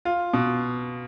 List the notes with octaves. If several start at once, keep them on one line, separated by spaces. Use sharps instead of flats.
F4
B2